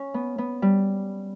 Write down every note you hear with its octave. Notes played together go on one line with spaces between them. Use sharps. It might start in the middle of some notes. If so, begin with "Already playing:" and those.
Already playing: C#4
B3
B3
G3